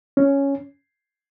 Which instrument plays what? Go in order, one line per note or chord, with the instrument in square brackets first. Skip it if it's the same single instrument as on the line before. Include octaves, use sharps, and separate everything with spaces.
[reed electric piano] C#4